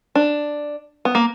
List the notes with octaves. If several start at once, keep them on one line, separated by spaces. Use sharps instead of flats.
D4
B3
A#3